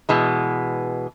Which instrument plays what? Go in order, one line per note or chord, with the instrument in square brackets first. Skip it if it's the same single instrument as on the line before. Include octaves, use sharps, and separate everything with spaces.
[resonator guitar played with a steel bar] B2 E3 G#3